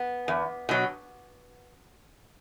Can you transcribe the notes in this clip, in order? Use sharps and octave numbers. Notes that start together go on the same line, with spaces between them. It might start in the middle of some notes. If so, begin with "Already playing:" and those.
Already playing: B3
E2
B2 F#3